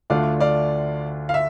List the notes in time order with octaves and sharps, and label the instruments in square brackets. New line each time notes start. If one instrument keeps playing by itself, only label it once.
[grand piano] D2 D3 A3 D4 F4 [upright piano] D5 F5
[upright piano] D5 F5
F5
E5